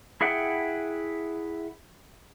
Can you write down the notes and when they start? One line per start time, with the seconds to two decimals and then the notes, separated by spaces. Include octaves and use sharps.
0.21 E4 G#4 E5 F#5 G5